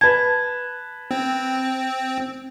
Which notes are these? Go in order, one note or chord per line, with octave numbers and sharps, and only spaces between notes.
B4 A5 G#6
C4